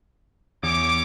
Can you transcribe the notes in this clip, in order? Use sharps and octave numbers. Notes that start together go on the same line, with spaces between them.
E2 C#5 D6